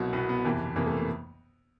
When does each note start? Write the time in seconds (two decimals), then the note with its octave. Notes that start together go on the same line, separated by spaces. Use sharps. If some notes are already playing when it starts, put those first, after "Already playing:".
Already playing: C2 B2 F#3
0.13 C2 B2 F#3 B3
0.29 B3
0.44 G1 F2 C3 E3 A#3
0.75 G1 F2 C3 E3 A#3
0.86 A3
0.97 A#3